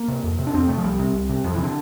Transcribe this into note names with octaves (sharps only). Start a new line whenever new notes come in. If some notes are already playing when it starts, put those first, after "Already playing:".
Already playing: A#3
C3
F2
C3
D4
F2 C4
C3 A3
F3
C2 G3
C3
C2
C3
F2 F3
E3
C3
D3